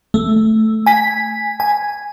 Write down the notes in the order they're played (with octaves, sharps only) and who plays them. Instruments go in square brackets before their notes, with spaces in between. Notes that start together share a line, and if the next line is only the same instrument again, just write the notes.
[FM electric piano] A3
G#5 B6
G#5